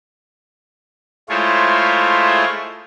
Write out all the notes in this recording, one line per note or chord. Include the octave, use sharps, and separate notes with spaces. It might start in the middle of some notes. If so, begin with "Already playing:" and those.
G#3 A3 E4 F4 C5 C#5